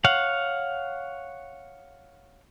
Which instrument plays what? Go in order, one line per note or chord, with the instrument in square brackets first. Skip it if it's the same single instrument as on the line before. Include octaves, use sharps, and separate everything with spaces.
[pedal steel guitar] C#5 F5 F#5